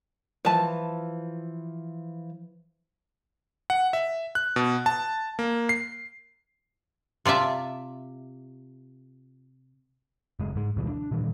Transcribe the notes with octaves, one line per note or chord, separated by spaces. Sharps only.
E3 F3 B4 A5
F#5
E5
F#6
B2
A5
A#3
C7
C3 F4 D5 E5 A5
F#1 G#3
G#2 G#3
D2 B2 E3 G3
D4
A#2 D#3 E3 G3